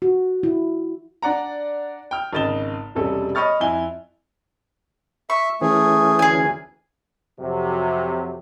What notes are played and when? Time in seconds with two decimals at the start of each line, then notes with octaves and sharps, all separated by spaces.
0.02 F#4
0.43 E4
1.22 D4 D5 F#5 A#5
2.11 G5 F6
2.33 G#1 C#3 D#5 A6 E7 G7
2.95 E1 C3 G3 C#4 A4
3.35 C#5 D#5 B5 C#6 F6 A6
3.60 F2 E4 G#5 G7
5.30 E5 C#6
5.61 E3 A3 C#4 G#4
6.19 D2 G#4 G#5
7.40 F2 C3 F#3